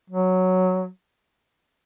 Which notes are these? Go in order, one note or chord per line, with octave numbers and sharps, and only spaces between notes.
F#3